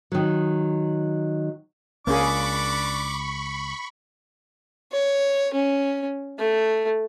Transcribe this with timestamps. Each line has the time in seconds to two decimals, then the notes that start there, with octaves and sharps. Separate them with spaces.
0.12 D#3 F#3
2.07 C#2 A#3 C#4 D4 G#4 B5 C#6 D6
4.92 C#5
5.54 C#4
6.39 A3